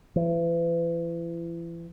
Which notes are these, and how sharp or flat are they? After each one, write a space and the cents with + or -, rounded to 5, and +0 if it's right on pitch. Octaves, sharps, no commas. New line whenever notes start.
E3 +35